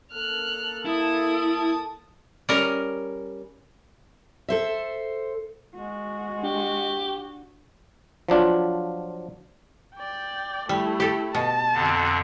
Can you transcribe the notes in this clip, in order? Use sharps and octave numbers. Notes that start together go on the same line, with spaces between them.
A#3 A4 F6 F#6
E4 A5 D#6
G3 C#4 A#4
A4 C5 E5
G#3 F#4
D4 G4
F3 F#3 D4 F4
D5 G5
G3 A3 E4
G4 A4
B2 A5
F2 D3